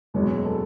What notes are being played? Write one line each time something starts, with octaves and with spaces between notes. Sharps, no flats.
F#1 E2 B2 G#3 C#5
A4